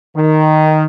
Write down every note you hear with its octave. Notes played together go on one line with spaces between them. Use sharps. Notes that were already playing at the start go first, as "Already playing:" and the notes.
D#3